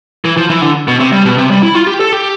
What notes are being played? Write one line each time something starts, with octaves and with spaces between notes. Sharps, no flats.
E3
F3
E3
D3
B2
C3
G3
B2
C3
G3
E4
F4
G4
A4
G4